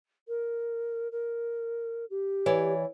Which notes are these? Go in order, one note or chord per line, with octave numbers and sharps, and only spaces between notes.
A#4
A#4
G4
E3 C#5 D5